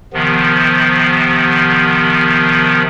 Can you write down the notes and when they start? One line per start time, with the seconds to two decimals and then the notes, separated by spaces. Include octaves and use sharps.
0.13 C3 D#3 F3 B3